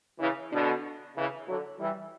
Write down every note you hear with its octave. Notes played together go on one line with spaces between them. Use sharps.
C#3 E3
B2 D3
C#3 E3
D3 F#3
E3 G3